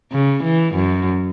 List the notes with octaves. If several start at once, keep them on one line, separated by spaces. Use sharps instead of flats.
C#3
E3
F#2